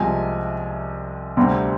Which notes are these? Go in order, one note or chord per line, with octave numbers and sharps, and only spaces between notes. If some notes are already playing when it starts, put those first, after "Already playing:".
Already playing: C2 C3 F3 G#3 G#5
D2 C3 G3 C4